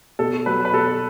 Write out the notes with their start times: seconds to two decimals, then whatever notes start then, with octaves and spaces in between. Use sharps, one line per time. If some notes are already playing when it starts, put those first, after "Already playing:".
0.19 B2 A4
0.46 F#3 B4
0.65 B4
0.73 B2 A4